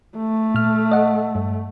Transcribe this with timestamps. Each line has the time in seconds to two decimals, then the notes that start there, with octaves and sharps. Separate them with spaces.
0.17 A3
0.54 A#2 F6
0.92 D#5 F#5
1.35 G2